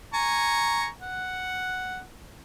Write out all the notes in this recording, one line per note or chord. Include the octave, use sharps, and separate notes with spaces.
G#5 A#5 C#6
F#5